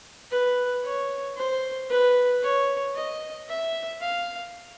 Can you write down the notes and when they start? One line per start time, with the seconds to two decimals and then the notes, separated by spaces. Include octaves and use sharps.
0.31 B4
0.84 C#5
1.37 C5
1.90 B4
2.42 C#5
2.95 D#5
3.49 E5
4.01 F5